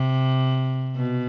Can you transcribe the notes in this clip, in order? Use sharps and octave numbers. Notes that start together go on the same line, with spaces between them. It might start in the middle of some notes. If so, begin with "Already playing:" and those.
Already playing: C3
B2